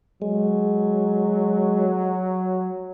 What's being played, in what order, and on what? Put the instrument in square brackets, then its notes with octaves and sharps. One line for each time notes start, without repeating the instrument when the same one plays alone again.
[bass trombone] F#3 [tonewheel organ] G#3